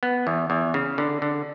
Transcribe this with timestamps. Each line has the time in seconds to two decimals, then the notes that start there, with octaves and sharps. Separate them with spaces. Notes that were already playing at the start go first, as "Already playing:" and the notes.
0.03 B3
0.27 E2
0.50 E2
0.74 C#3
0.98 D3
1.22 D3